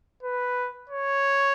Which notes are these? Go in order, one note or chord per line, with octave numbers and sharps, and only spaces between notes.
B4
C#5